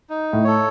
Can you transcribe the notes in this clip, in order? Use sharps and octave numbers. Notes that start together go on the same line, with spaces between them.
D#4
A2
A4 C#5